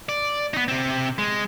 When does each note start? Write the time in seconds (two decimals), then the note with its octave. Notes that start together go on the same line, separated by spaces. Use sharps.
0.09 D5
0.53 B3 D#4
0.68 C3 C4
1.18 G#3